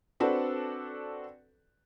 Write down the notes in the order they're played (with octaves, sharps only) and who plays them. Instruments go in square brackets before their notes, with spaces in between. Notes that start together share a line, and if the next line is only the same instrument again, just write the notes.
[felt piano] C4 D4 F#4 A4 B4 D5